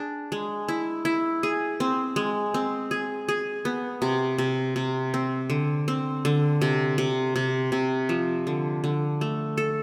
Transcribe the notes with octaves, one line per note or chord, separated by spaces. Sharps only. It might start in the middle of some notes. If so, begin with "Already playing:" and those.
Already playing: D4 G#4
G#3
E4
E4
G#4
C4
G#3
C4
G#4
G#4
B3
C3
C3
C3
C4
D3
C4
D3
C3
C3
C3
C3
F3
D3
D3
A3
A4